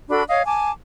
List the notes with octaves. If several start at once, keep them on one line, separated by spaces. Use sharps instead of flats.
D4 F#4 A4 B5
C#5 D#5 F5
G#5 A5 D6